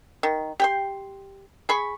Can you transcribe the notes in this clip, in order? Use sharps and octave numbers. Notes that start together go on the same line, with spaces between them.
D#3
G4 G5 C6
G#4 B5 C#6